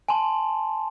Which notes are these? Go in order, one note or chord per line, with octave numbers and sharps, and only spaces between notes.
G#5 A5 C6